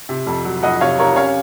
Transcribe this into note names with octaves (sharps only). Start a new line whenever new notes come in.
C3
F2
F#3
F2 D#5 F#5
C3 C#5 F5
C3 A#4 C#5
C#4 C#5 F5